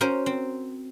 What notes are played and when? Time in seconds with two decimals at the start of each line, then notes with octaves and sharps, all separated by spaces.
0.01 C#4 F#4 A#4 C5
0.26 C4